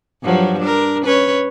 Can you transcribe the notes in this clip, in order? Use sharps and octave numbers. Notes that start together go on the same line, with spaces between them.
G2 F3 F#3
D4 A#4
C#4 B4 C#5